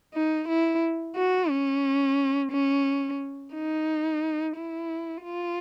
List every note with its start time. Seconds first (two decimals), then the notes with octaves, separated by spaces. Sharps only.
0.14 D#4
0.48 E4
1.16 F#4
1.50 C#4
2.51 C#4
3.54 D#4
4.56 E4
5.23 F4